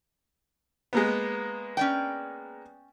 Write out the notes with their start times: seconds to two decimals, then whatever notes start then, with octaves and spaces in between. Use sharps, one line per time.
0.93 G#3 A#3 B3
1.77 C#4 D5 G5